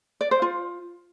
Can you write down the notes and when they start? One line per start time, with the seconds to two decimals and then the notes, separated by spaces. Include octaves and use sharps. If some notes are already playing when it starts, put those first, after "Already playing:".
0.21 D5
0.31 C5
0.42 F4